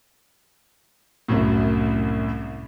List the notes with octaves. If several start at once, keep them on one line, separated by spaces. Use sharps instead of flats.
C2 F#2 A2